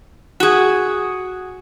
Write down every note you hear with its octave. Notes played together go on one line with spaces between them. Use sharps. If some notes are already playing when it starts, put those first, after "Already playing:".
F#4 G#4